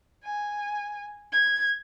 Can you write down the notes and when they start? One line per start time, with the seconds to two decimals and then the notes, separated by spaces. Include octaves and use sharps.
0.23 G#5
1.32 G#6